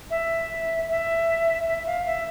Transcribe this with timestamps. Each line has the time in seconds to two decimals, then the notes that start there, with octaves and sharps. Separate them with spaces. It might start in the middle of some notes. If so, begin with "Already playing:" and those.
0.10 E5
0.89 E5
1.67 E5
1.86 F5
2.06 E5